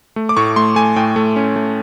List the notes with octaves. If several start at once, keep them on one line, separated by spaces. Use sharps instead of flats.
A3
D6
A2 C#6
A3 C6
A3 G#5
A2 G5
A3
C#4
A3